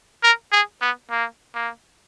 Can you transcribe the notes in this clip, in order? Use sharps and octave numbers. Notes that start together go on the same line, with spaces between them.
A#4
G#4
B3
A#3
A#3